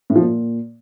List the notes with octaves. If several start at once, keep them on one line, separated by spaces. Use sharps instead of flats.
A2
F3
A#2